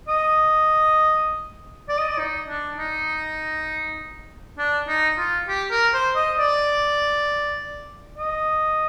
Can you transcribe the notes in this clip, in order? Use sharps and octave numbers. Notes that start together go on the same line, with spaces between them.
D#5
D5
D#5
D5
D#4
D4
D#4
D4
D#4
F4
G4
A#4
C5
D#5
D5
D#5